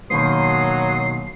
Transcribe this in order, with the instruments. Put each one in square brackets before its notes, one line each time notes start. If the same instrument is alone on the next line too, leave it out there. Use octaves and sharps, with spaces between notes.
[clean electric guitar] B2 D#3 A#3 [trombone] F#3 [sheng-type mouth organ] C6 D#6 [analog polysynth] C7